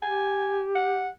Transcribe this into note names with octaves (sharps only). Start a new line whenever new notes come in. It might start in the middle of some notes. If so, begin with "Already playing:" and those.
G4 G#5
F#5